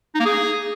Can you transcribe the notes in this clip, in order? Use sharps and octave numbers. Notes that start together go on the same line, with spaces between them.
D#4
A#3
G#4